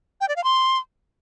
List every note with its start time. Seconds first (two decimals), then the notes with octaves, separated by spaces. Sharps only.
0.21 G5
0.29 D5
0.36 F5
0.44 C6